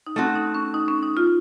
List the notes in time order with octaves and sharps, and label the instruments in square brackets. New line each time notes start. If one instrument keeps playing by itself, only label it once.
[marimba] D#4
[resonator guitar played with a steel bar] A3 C4 F#4 [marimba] C#4
[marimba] D#4
C#4
D#4
C#4
D#4
F4